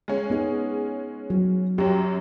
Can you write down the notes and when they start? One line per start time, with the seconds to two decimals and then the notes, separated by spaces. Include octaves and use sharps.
0.08 G#3 C#4
0.30 B3 D#4 G#4
1.30 F#3
1.78 F#2 F#3 G4